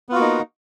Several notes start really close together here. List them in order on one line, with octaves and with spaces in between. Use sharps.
B3 F4 F#4 A#3 D#4